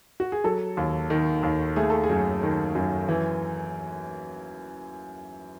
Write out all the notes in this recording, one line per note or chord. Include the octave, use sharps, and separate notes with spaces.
F#4
G#4
F#3 A4
D#2
D#3
D#2
A3 G#4
A4
G#4
F#2
D#3
F#2
E3